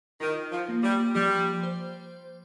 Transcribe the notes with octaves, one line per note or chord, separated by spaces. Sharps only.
D#3 F4
F3
A#3
G3
F3 G3
C5